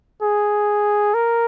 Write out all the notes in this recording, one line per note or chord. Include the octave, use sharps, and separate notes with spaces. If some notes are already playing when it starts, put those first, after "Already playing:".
G#4
A#4